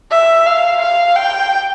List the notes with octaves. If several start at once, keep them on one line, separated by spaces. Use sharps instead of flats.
E5
F5
F5
G5